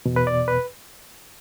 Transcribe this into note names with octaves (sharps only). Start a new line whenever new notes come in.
E2 B2
B4
D5
B4